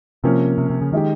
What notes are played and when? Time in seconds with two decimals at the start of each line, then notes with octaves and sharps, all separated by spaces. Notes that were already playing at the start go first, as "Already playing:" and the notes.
0.24 C3 F3 A#3 C#4
0.58 C3
0.70 C3
0.81 C#3
0.92 D#3 G#3 D#4 G4